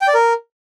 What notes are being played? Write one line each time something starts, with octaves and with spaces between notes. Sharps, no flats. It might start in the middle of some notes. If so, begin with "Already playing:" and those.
G5
D5
A#4